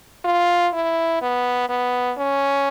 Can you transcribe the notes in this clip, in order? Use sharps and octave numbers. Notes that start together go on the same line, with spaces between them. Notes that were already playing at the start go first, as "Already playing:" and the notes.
F4
E4
B3
B3
C#4